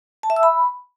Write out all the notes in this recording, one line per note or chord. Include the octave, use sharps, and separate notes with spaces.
A5
E5
E6
B5